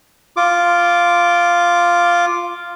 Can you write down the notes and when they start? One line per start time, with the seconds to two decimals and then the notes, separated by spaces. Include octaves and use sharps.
0.37 F4 D6